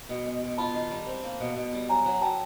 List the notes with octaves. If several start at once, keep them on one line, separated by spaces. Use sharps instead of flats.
B2
G#3
B2
F4 A5 B5
D#3
G3
C4
A#3
B2
B2
G3
F#3 G#5 A#5
F#3
F#3 G5 A5